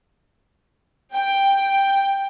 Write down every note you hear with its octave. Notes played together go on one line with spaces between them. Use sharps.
G5